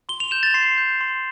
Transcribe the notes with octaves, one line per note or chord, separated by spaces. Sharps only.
C6 G7
F7
G6 E7
A6
C6 C7
G6
C6